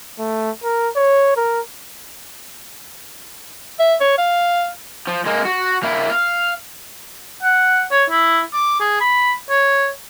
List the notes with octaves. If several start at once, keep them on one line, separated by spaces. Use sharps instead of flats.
A3
A#4
C#5
A#4
E5
C#5
F5
F3
G#3 A#3
F#4
A#3 E4
F5
F#5
C#5
E4
D6
G#4
B5
C#5